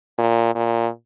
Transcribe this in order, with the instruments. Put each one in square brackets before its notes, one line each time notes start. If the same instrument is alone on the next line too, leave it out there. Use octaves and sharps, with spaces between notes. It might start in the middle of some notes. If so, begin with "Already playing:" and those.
[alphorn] A#2
A#2